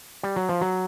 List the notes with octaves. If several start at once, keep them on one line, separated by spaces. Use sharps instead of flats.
G3
F#3
F3
F#3